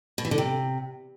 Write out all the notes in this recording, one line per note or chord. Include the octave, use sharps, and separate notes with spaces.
B2
E3
D3
C3